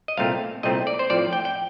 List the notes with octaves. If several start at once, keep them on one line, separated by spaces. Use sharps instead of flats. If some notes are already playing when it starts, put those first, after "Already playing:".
D#5
C2 A#2 A3 C4 F5
C2 A#2 A3 C4 D#5
D5
C5
A2 F3 C4 D5
G5
G5